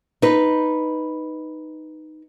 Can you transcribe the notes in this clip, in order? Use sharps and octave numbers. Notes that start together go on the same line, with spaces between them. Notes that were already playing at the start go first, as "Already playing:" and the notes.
D#4 B4